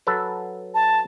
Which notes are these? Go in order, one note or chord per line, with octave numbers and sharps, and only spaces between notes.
F#3 A4 B4
A5